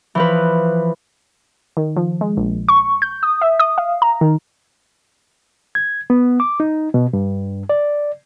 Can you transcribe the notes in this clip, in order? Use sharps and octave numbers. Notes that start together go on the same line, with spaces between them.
E3 F3 B4
D#3
F3
G#3
A#1
C#6
G6
D#6
E5
D#6
F5
A#5
D#3
G#6
B3
D6
D#4
B2
G2
D5